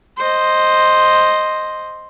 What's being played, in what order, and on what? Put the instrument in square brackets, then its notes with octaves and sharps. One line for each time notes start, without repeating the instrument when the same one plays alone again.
[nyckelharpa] C5 D#5